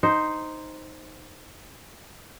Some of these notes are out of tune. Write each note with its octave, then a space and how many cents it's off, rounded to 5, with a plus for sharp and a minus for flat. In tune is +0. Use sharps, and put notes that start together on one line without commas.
D#4 +0 C5 +0